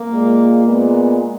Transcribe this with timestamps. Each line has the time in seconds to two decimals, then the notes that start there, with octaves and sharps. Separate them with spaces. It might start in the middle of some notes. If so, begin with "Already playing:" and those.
Already playing: A#3
0.11 A#2 G#3
0.65 A#2 G#3 B3